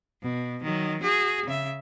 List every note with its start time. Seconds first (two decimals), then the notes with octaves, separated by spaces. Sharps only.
0.22 B2
0.63 D#3 F#3
1.02 F#4 G#4
1.45 C#3 E5